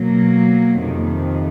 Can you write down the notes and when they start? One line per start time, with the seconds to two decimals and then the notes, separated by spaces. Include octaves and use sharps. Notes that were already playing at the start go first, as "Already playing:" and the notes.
Already playing: B2 F#3 A#3
0.78 F2 C3 D#3